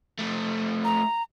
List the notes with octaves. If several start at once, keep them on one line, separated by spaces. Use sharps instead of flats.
F3 A3
A#5